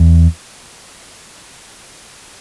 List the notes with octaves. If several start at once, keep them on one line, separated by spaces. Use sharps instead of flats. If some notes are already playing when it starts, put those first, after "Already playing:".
Already playing: E2